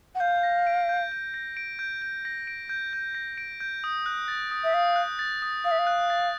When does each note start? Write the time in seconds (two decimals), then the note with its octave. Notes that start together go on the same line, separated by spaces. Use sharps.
0.15 F#5
0.20 F5 G6
0.43 A#6
0.67 D7
0.89 G6
1.12 G6
1.34 A#6
1.57 D7
1.79 G6
2.02 G6
2.25 A#6
2.47 D7
2.69 G6
2.93 G6
3.15 A#6
3.38 D7
3.60 G6
3.84 D#6
4.06 F#6
4.28 A6
4.51 D#6
4.64 E5
4.73 F5 D#6
4.96 F#6
5.19 A6
5.42 D#6
5.65 F5 D#6
5.71 E5
5.79 F5
5.87 F#6
6.10 A6